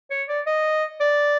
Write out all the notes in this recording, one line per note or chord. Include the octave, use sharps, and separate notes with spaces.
C#5
D5
D#5
D5